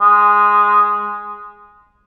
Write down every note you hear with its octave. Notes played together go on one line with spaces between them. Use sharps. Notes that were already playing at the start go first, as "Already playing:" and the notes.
G#3